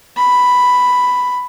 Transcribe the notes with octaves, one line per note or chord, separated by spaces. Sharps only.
B5